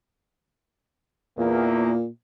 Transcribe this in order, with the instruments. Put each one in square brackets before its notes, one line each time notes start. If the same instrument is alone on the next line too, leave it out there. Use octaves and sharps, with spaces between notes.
[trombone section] E2 A#3 [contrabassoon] A#2